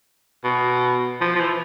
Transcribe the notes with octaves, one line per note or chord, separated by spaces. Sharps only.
B2
F3
F3
E3